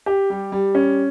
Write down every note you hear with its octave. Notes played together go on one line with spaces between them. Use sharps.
G4
G3
G3
C#4